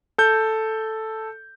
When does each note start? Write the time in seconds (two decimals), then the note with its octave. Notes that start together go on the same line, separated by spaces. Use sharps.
0.18 A4 G6